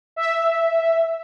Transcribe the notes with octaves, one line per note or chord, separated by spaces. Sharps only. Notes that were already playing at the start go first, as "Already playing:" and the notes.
E5